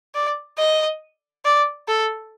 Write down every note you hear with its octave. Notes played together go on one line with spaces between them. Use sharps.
D5
D#5
D5
A4